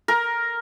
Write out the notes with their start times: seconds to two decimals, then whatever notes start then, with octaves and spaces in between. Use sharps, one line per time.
0.08 A#4